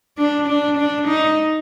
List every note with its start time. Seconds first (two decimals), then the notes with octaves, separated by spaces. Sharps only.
0.18 D4
0.48 D4
0.78 D4
1.08 D#4